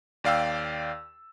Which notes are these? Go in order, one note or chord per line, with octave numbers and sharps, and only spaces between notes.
D#2 D5 F5 G5 E6